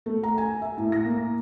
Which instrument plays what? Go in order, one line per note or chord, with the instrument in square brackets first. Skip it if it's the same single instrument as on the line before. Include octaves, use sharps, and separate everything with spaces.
[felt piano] A3
A#5
G#5
E5
A2
A#6
A#3